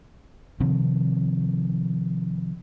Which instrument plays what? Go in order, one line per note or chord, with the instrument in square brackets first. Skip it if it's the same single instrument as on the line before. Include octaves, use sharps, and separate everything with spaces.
[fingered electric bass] C3 D#3 F3 C4